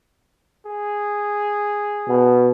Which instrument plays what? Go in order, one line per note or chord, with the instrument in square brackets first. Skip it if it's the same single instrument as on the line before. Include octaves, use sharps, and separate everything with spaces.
[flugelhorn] G#4
[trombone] B2